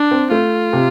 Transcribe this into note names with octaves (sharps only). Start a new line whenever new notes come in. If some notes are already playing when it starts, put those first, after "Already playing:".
Already playing: D4
C4
A3 F4
C3